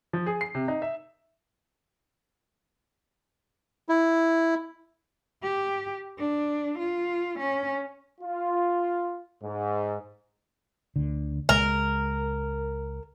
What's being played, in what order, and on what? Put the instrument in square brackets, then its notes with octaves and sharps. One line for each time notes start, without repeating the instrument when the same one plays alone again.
[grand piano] F3
G#4
C7
C3
D#4
E5
[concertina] E4
[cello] G4
D4
F4
C#4
[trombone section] F4
G#2
[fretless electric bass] D2 D3
[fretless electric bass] C#2 G#3 [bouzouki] A#4